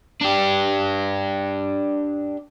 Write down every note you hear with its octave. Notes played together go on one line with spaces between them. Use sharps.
D4 G4